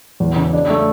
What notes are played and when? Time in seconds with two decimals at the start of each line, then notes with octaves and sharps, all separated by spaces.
0.20 E2
0.36 C#3
0.53 D4
0.70 A3